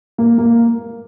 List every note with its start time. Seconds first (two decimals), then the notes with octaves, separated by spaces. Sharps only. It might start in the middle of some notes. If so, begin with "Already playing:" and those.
0.18 A#3
0.38 A#3